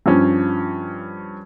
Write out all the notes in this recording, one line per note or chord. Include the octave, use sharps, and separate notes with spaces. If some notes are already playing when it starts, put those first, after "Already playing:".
G2 F3 C#4